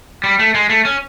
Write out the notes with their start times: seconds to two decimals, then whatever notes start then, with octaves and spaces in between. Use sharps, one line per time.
0.24 G3
0.39 A3
0.55 G#3
0.70 A3
0.85 C#4